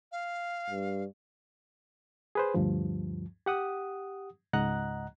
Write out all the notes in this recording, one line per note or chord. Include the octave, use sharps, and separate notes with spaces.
F5
G2
G#4 B4 C5
D2 G2 F3
G4 F#5 D#6
C#2 G#2 D#5 F#5 A#5 F#6